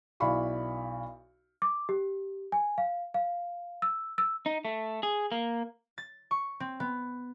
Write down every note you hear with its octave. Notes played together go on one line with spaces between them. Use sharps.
B1 E4 D5 F5 B5 C#6
D6
G4
G#5
F5
F5
E6
E6
D#4
A3
G#4
A#3
A6
C#6
C4
B3